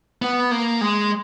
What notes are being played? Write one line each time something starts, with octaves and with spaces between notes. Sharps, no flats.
B3
A#3
G#3